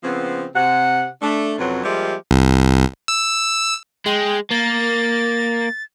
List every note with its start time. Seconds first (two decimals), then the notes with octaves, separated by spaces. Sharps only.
0.03 C#3 F3 B3 C4
0.55 C3 F#5
1.22 A3 D4
1.59 F2 C3 F#3 C4 C#4 B4
1.83 F3 G3 G#3 A#3 G4 E5
2.31 C2
3.08 E6
4.06 G#3 G5
4.51 A#3 A6